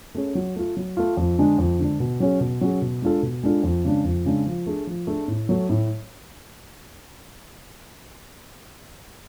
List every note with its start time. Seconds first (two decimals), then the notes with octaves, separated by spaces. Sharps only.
0.15 A3 C#4 G#4
0.35 F#3
0.56 A3 F4
0.77 F#3
0.97 A3 F4
1.17 F2
1.38 D3 G#3 D4
1.58 F2
1.79 D3 G#3 D4
2.00 B2
2.20 F#3 C#4 G#4
2.40 B2
2.61 F#3 C#4 G#4
2.82 B2
3.02 G#3 D4 F4 A4
3.23 B2
3.43 G#3 D4 F4 A4
3.63 F2
3.85 C#3 G#3 D4
4.04 F2
4.25 C#3 G#3 D4
4.46 F3
4.66 A3 D4 G#4
4.87 F3
5.07 A3 D4 G#4
5.28 A2
5.49 F#3 A3
5.69 A2